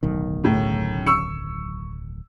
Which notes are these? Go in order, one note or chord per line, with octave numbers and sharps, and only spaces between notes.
D1 B1 D#3
F#2 A2 C#3
C#6 E6 C#7